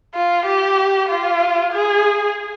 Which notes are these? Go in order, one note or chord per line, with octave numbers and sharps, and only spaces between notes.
F4
G4
F4
G#4